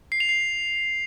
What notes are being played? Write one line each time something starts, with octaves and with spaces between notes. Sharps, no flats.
C7
F7
C7